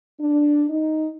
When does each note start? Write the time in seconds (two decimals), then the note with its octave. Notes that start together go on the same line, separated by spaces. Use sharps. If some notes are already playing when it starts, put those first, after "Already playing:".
0.19 D4
0.70 D#4